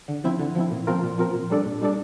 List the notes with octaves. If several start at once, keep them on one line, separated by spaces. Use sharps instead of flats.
D3
F3 C4 E4
D3
F3 C4 E4
A#2
F3 C4 F4 A#4
A#2
F3 C4 F4 A#4
A#2
G3 D4 A4 D5
A#2
G3 D4 A4 D5